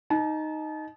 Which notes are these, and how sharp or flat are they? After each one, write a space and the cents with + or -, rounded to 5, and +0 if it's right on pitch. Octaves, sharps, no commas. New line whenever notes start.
D#4 +0 A5 -35